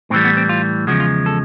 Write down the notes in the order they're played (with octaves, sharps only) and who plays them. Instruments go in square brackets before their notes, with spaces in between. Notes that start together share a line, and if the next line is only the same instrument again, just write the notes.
[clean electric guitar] A2 C4
E3 G3
B3
C4
F4
E2 C#3 F3 G#3 F#4
F4
A4